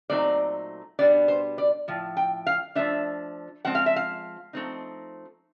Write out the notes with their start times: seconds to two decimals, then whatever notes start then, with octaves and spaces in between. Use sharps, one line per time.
0.10 A#2 F#3 A3 C4 D#4 D5
0.99 B2 G3 B3 D4 D5
1.28 C5
1.58 D5
1.88 A2 F3
2.17 G5
2.47 F5
2.75 F3 A3 D4 E5
3.65 F3 G#3 C4 F#5
3.75 F5
3.86 E5
3.96 F5
4.53 F3 A3 C4 D#4